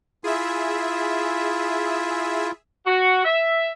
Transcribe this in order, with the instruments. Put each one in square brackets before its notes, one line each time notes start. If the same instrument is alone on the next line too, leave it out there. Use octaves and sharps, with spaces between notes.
[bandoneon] E4 F4 [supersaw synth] G#4 E5
[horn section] F#4
E5